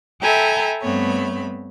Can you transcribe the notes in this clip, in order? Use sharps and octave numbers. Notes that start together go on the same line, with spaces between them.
A4 E5 G5 G#5 A#5 B5
G2 A3 B3 C4 C#5 B5